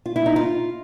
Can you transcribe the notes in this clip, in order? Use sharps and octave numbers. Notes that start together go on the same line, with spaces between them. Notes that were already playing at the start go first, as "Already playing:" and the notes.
F4
E4
D#4
F4